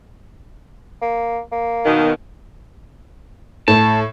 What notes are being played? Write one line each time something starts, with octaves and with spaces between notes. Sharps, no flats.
A#3
A#3
B2 D#3
A2 A5